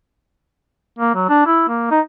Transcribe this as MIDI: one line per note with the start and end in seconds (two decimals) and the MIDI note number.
0.99 1.15 58
1.15 1.28 54
1.29 1.45 62
1.46 1.64 64
1.68 1.91 58
1.91 2.00 63